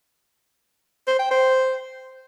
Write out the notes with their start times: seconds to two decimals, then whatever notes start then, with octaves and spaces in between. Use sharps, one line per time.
1.07 C5
1.19 G5
1.31 C5